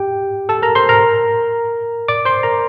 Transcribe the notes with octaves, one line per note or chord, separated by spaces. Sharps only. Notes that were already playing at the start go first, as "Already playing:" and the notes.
Already playing: G4 G5
A4 A5
A#4 A#5
C5 C6
A#4 A#5
D5 D6
C5 C6
A#4 A#5